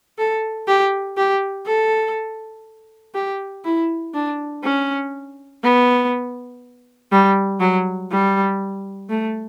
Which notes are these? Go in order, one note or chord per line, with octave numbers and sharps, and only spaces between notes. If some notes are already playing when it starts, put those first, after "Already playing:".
A4
G4
G4
A4
G4
E4
D4
C#4
B3
G3
F#3
G3
A3